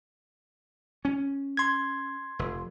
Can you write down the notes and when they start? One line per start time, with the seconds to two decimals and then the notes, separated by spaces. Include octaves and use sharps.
1.05 C#4
1.57 C6 G#6
2.39 F1